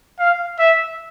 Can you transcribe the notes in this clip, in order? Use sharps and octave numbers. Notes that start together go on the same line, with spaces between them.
F5
E5